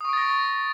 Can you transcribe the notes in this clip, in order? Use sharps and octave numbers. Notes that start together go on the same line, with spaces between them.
C#6 D#6 A6 A#6 D7